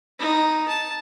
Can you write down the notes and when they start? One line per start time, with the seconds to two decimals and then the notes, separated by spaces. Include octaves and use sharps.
0.19 D#4
0.68 A5